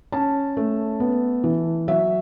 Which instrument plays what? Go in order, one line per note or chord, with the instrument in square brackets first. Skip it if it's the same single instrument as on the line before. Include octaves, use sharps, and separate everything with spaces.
[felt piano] C#4 A5
A3
B3
E3
F#3 E5